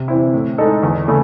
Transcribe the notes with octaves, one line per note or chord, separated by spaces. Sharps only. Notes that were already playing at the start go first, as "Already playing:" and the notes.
Already playing: C3
E3 C4 E4
A2
G#3 D#4 A4
E2
C#3 A3